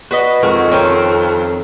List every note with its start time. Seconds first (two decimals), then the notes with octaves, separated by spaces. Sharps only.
0.11 F#4 B4 D#5
0.43 F2 D#3 G#3 F#4
0.71 D#3 C4 C#4